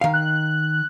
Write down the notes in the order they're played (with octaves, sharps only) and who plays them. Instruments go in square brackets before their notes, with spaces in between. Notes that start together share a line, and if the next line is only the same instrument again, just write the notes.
[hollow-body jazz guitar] D#3 F5
[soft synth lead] F#6